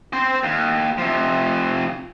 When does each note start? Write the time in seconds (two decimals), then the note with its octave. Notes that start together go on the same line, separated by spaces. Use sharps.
0.13 C4 C5
0.43 D#2
0.98 C3 F3